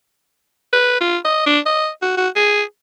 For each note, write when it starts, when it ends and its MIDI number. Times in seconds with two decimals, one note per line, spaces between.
0.73 0.98 71
1.01 1.17 65
1.25 1.42 75
1.46 1.59 62
1.66 1.89 75
2.02 2.14 66
2.17 2.28 66
2.36 2.63 68